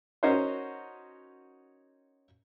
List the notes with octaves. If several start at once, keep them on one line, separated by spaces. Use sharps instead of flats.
C#4 D#4 F#4 A#4 C5 C#5